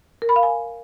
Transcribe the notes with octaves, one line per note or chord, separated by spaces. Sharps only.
A#4
B5
F5
G#5